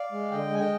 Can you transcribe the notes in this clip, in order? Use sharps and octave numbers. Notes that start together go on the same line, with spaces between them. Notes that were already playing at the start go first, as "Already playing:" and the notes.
Already playing: D5 F5
G#3
D3 D#5 G5
G#3 G#5
D#5 G5